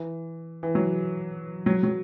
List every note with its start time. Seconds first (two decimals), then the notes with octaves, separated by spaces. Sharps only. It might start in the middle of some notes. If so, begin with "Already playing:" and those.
Already playing: E3
0.63 E3
0.75 F#3
1.66 F#3
1.83 F#3